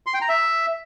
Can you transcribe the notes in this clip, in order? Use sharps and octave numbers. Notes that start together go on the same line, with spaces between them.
C6
G5
A#5
E5